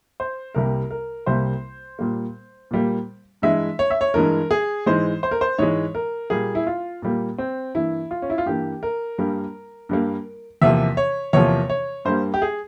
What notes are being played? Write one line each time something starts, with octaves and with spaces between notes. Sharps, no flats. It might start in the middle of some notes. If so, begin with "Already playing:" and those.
C5
C2 C3 G3 A#3 A#4
A#4
C2 C3 G3 A#3 C5
A#2 G3 A#3
A#2 G3 A#3
G2 E3 G#3 E5
C#5
E5
C#5
G2 E3 G#3 A#4
G#4
G#2 E3 G#3 C5
C5
A#4
C5
G#2 E3 G#3 C#5
A#4
A#2 G3 A#3 G#4
E4
F4
A#2 G3 A#3
C4
G2 E3 A#3 E4
F4
C#4
E4
F4
G2 E3 A#3 G4
A#4
G2 G3 A#3
G2 G3 A#3
E2 C3 F3 A#3 E5
C#5
E2 C3 F3 A#3 C#5
C#5
G2 G3 A#3 C5
G4
G#4